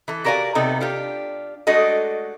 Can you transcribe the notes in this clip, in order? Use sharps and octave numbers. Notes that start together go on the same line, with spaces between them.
E3 A4
F#4 G4 A#4 D5 F5 G#5
C3 B3 D#4 A4
D4 F4 G4
G#3 A3 D4 F#4 A4 D#5